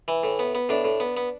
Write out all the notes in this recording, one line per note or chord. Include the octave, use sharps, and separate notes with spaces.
E3
A2
B3
B3
A2 D4
A2
B3
B3